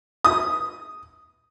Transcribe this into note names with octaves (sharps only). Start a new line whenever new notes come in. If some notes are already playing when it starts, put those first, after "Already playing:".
D#6